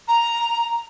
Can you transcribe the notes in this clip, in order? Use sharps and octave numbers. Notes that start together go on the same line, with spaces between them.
A#5